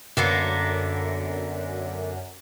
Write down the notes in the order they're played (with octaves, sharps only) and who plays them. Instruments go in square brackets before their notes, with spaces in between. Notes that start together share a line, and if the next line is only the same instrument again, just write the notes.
[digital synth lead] F#2 [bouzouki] D3 A#3 B3